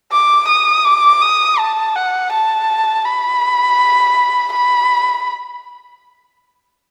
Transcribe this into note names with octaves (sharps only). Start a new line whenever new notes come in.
D6
D#6
D6
D#6
A5
F#5
A5
B5
B5